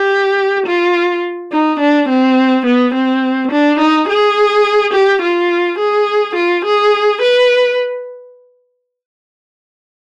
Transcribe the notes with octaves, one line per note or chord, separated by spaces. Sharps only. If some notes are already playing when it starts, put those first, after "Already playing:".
Already playing: G4
F4
D#4
D4
C4
B3
C4
D4
D#4
G#4
G4
F4
G#4
F4
G#4
B4